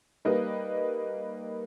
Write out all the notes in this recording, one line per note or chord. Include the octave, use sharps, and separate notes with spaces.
G3 A#3 D#4 B4 D#5